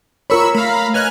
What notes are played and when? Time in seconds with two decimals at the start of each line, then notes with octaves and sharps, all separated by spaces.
0.30 F4 A#4 C#5 B5 C#6 E6
0.54 A3 F5 A#5 B5
0.94 B4 C#5 D#5 G#5 F6 F#6